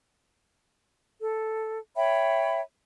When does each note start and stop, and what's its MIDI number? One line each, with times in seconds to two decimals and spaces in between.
1.19 1.77 69
1.96 2.61 73
1.96 2.61 76
1.96 2.61 79
1.96 2.61 83